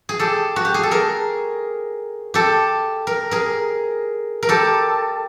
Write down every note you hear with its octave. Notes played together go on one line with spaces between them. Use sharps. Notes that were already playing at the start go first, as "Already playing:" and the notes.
G#4
G4 A4
F#4
G4
G#4
A4
G#4 A#4
G4 A4
A#4
G#4 A#4
A#4
G4 A4